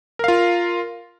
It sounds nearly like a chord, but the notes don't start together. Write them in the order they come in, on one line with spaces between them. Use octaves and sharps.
A#4 F5 F4